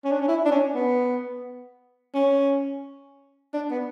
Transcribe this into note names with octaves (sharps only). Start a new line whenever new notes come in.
C#4
D4
C#4
E4
D4
C#4
B3
C#4
D4
B3